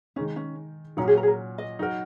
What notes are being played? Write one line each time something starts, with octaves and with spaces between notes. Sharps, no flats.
D#3 G#3 C#4 D#4
C#4
A#2 F#3 C#4 D#4 F#4
G#4
A#4
G#4
A#4
D#5
F#3 D#4 F#4 A#4